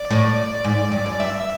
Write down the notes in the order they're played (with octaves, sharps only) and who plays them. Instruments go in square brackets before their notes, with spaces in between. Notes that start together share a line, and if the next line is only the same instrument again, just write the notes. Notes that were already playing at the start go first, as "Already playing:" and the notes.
Already playing: [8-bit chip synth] D5
[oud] A2
G#2
G2
F#2
[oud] G2 [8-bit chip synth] E5